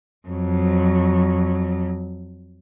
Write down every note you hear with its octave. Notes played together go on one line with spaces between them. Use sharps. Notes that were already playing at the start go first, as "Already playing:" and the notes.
F2 F#3